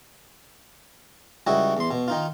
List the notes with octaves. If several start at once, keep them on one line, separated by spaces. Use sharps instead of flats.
C#2 G3 E4 F#4 D#5
E2 C6
B2
D#3 D#4 F4